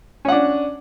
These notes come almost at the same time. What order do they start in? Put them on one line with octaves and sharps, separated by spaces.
C#4 F#5 D4